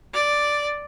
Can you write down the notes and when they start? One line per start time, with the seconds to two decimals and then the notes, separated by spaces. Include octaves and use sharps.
0.14 D5